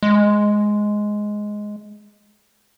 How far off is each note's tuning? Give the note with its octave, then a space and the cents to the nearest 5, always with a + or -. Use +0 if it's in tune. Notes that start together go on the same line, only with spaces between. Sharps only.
G#3 +5